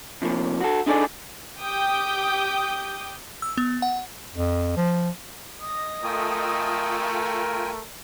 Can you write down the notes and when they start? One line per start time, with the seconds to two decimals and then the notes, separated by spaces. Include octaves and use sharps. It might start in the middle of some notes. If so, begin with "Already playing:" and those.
0.22 C3 F3 A#3
0.60 F#4 A4
0.86 D4 D#4 G#4 A4 D5
1.60 G4 G5 D6 D#6 G6
3.42 E6
3.57 B3
3.82 F#5
4.35 F2
4.76 F3
5.60 D#5 D#6
6.04 A3 F4 A#4 G5 G#5